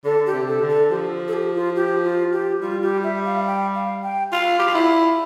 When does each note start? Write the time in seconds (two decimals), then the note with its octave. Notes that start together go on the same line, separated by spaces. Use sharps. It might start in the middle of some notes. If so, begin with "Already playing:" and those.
0.05 D3 A4
0.26 G4
0.33 C3
0.48 A4
0.62 D3
0.69 A4
0.90 F3 G4
1.28 A4
1.33 G4
1.55 F4
1.76 G4
2.04 F4
2.33 G4
2.61 G3 F4
2.83 G4
3.04 E5
3.25 F5
3.47 G5
3.75 F5
4.04 G5
4.32 F4 F5
4.59 G4
4.67 F4
4.75 E4